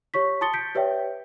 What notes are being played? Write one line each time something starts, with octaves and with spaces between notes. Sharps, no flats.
G4 C#5 C#6 B6
A5 C6 D#6 A6 C#7 G7
G6 B6 C#7 D7
G4 B4 C#5 D5 E5 G5